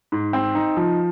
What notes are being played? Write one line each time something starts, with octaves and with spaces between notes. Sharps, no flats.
G#2
C4
D#4
F3